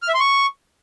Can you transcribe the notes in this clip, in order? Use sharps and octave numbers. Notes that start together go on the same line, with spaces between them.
F6
E5
C6
C#6